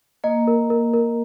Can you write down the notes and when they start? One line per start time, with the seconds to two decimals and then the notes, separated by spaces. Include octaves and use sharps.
0.24 A#3 D#5
0.47 A#4
0.70 A#4
0.94 A#4